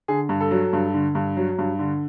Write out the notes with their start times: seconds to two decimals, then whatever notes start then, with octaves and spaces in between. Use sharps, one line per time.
0.08 D3 G#4
0.29 G2
0.41 A4
0.51 F#3
0.73 G2
0.94 D3
1.15 G2
1.37 F#3
1.59 G2
1.79 D3